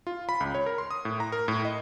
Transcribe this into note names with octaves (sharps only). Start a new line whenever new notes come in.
F4
B5
C#2
C#5
A#4
C6
D#6
A2
A#5
A#4
A2
D#5